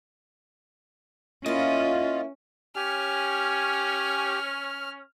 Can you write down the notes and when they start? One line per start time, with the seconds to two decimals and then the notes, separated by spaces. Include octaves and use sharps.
1.46 A#3 C#4 E4 F4 D#5
2.76 C#4 G4 G#5 F6